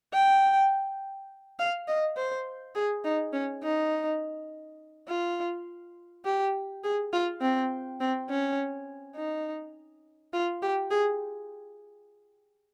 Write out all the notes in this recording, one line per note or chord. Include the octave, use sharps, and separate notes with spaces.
G5
F5
D#5
C5
G#4
D#4
C#4
D#4
F4
G4
G#4
F4
C4
C4
C#4
D#4
F4
G4
G#4